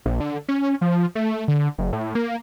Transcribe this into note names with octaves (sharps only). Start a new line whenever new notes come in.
A#1
D3
C#4
F3
A3
D3
F#1
A2
A#3